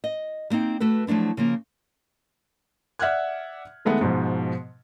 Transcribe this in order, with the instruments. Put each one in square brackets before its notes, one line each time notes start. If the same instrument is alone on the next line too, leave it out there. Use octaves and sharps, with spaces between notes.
[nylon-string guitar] D#5
G3 A#3 C4 D#4
A3 F#4 A4 B4
F3 F#3 A3 D4 E4
C#3 F3 A#3
[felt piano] D5 E5 F#5 F6 F#6 G#6
D#3 G#3 A3 B3
G#2 B2 F3